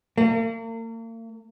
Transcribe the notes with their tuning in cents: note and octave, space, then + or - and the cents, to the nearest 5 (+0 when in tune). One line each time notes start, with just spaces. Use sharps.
A#3 -40